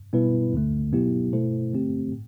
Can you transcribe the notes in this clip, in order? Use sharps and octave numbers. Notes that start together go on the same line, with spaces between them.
B2 G3 B3 E4 B4
D2 D3 A3
B2 F#3 B3 E4 G4
B2 A3 E4 A4 C5
D3 A3 C4 G4
A2